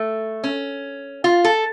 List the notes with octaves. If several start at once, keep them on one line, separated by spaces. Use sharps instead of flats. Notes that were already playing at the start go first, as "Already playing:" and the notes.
Already playing: A3
C#4
F4
A4